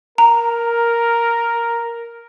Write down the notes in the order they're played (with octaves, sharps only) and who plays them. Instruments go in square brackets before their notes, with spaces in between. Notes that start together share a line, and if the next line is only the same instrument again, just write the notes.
[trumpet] A#4 [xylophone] A#5